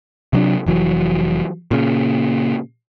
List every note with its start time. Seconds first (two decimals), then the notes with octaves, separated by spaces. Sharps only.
0.33 C3 F#3 D4
0.66 F1 E3 F#3
1.71 A#2 C#3